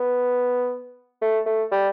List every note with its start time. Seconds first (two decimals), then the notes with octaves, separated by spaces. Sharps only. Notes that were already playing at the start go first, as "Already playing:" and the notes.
Already playing: B3
1.22 A3
1.46 A3
1.71 G3